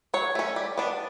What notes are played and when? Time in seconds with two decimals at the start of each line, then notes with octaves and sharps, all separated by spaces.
0.14 F#3 C#5
0.35 A3 C#4
0.56 G3
0.78 B3 D4